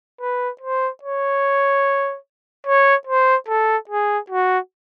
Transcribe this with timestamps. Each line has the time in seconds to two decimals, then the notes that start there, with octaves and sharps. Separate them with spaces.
0.21 B4
0.61 C5
1.03 C#5
2.67 C#5
3.07 C5
3.48 A4
3.89 G#4
4.30 F#4